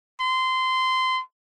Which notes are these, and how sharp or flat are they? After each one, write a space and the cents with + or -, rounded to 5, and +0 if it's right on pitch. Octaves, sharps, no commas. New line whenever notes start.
C6 -20